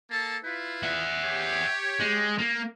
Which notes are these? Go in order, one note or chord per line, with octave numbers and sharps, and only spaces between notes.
A#3 A4 A5
E4 F4 B4
E5 F#5
G4 C#5
G#3
A#3